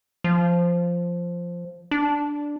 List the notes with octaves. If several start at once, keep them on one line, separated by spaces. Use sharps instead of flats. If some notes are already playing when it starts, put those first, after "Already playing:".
F3
D4